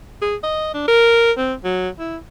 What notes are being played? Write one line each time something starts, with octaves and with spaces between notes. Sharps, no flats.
G#4
D#5
D4
A#4
C4
F#3
E4